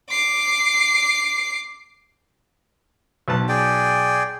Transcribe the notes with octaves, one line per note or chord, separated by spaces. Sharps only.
D6 C7
B1 B4 A5
G#4 D5 G5